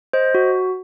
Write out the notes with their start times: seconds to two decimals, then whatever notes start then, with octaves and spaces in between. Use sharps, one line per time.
0.13 C5 D#5
0.35 F#4